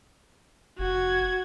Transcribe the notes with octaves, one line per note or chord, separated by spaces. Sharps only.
F1 F#4 G#6